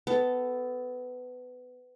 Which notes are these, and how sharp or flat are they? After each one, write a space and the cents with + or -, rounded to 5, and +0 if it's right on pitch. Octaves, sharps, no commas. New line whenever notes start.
B3 +20 A4 +0